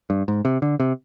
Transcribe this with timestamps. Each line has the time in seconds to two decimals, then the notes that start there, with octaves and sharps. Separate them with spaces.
0.10 G2
0.28 G#2
0.45 C3
0.62 D3
0.80 C3